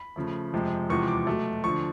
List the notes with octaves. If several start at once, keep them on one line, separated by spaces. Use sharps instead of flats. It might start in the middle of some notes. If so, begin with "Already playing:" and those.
Already playing: B5
C#3 F3 A3
F2 C3 F3 G#3
E2 C3 F3 G#3 C#6
D6
B2 F#3 A3
D3 F3 C#6